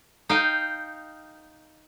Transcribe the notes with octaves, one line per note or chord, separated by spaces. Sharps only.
D#4 F5 G5